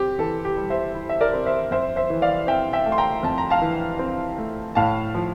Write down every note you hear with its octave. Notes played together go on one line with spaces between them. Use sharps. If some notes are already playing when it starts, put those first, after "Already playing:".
Already playing: C4 G4
E3 A4
G4
G3
C5 E5
E4
E5
A#4 D5
C4
C5 E5
F2 C5 E5
C5 E5
E3
D5 F5
C4 E5 G5
E5 G5
A3
C6
G5 A#5
F2 A5
A#5
F5 A5
E3
C4
A3
A2 F5 A5
F3